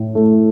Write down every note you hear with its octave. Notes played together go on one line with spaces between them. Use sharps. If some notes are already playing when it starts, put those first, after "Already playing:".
Already playing: A2
A3